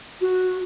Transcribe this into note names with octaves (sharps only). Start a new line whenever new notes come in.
F#4